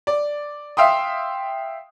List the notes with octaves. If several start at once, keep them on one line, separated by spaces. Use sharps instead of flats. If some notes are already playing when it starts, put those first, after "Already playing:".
D5
E5 F5 G5 C6 D#6